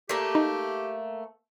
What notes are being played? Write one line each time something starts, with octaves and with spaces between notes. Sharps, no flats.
A3 A#3 G4 B6
D#4